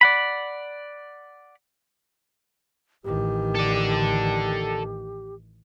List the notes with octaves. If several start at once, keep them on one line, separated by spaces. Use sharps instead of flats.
D5 F#5 B5
A1 D#3 G4
A4 D5